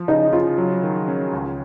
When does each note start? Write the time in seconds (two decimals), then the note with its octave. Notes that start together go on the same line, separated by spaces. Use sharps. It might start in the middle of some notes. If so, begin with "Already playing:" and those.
Already playing: F3
0.08 C#3 D#4
0.32 C#3 F4
0.58 F#3
0.83 D#3
1.08 C#4
1.33 C#2